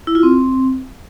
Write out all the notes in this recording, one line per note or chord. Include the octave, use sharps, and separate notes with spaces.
E4
F4
C4